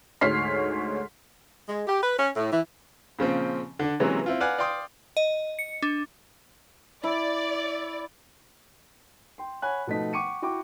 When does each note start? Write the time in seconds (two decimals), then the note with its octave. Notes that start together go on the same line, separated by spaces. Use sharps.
0.21 D2 G#2 C#5 F6 B6 C7
1.69 G#3
1.87 G4
2.03 B4
2.18 C#4
2.36 A2
2.52 E3
3.19 A#2 C#3 F3 C4
3.79 D3 D4
4.00 C3 E3 F#3 G#3 A#3 C#4
4.26 C4 E4 F4
4.40 B4 D5 F5 F#5 G#5
4.59 D5 F5 G5 C6 D6 D#6
5.17 D#5
5.59 C#7
5.82 D4
7.04 E4 D5
9.38 G5 C6
9.62 C#5 F#5 G#5 B5 F#6
9.87 B2 F3 A3 B3 D#4 B6
10.13 F#5 G5 C#6 D6 C#7 D#7
10.42 E4 F#4 G5 C#6 D6